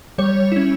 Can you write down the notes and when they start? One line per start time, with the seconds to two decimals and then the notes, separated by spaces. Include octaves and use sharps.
0.18 G3 C#5
0.52 C#4 E4